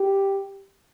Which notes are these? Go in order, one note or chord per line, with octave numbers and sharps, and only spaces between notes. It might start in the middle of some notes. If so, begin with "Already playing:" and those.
Already playing: G4